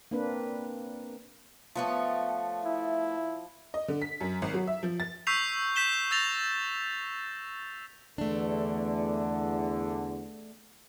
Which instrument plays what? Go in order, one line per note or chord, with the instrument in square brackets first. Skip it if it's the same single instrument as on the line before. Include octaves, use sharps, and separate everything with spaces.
[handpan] A#3 C4 D4 B4
[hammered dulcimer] F3 [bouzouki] A3 B3 C#5
[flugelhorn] E4
[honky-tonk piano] D#5
D3
B6
F#2
G#1
F#3
E5
F3
A6
[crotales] C#6 E6 G6 B6 C7 F7
G6 B6 E7 G7
E6 G6 A6 A#6 F7 G7
[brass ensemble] E2 D3 [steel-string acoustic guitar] A3 D4